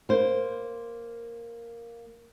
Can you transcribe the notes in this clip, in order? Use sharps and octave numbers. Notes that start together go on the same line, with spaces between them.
A#3 C5